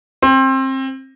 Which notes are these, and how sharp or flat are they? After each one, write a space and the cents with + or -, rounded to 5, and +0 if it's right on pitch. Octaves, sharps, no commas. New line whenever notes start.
C4 +25